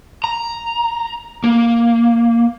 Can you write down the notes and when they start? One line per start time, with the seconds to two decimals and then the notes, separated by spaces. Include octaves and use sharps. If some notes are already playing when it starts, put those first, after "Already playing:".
0.24 A#5
1.44 A#3